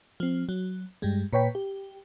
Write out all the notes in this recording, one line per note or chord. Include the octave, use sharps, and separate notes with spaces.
F3 C4
F#3
G2 G3 G#3
A#2 B4 C#5 G5 B6
G4